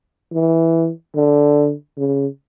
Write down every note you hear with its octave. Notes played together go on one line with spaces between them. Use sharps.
E3
D3
C#3